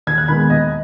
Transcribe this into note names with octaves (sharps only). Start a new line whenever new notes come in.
D#2 G#6
F#6
D#3 G#3 B3 B5
D#2 D#5